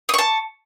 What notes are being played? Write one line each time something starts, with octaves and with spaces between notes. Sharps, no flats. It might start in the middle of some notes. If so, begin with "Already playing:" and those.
A5 C#6 D#6